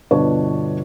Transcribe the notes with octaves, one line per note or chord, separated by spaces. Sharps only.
G1 B2 D4 B4 C#5